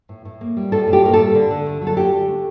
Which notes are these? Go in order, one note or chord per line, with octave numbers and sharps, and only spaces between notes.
A2
A2
A#3
G3
A2 A4
A2
G4
A#3 A#4
A4
G3
D3
D3
A3
F#3
A4
D3 G4
D3
A3